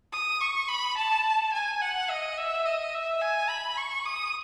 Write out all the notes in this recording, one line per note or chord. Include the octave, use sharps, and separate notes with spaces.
D#6
C#6
B5
A5
G#5
F#5
D#5
E5
D#5
E5
G#5
B5
C#6
D#6